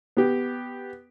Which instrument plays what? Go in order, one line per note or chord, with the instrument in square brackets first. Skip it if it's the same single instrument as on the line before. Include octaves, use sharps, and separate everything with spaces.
[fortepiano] B3 G4